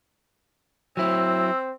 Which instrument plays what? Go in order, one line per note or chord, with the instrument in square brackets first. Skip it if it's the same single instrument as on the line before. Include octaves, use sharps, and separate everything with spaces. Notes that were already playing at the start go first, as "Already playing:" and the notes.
[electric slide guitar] F#3 E4 [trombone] C4 [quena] E6